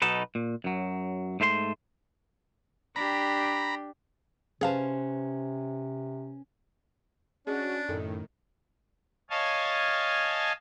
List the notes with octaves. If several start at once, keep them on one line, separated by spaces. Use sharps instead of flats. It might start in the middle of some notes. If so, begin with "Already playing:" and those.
B1 B2 D#4 A4 B4
A#2
F#2 F#3
G#2 A3 C5 E5 C6
D4 G4 A#5 B5
C3 C#4 G#4 B4 C5 F5 A5
C#4 D4 F#4 G#4 B4 D#5
F#2 A2 D#3 A4
C#5 D#5 F5 G#5 A5